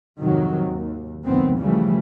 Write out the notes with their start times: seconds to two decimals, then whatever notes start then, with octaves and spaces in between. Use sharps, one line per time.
0.19 F2 G#2 C3 D#3 F#3
0.66 D#2
1.24 F1 C#2 A#2 D#3 B3 C4
1.57 C#3 E3 F3 G3 A3